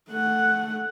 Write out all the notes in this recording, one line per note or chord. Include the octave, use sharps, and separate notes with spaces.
A3 F#5